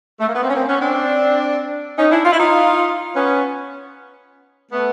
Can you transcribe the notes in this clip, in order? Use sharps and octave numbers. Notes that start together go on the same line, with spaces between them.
A3
A#3
B3
A#3 C4
C#4
A#3 C4
B3 C#4
C4 D4
C#4 D#4
D4 E4
F4
E4
D#4 F4
B3 C#4
A3 B3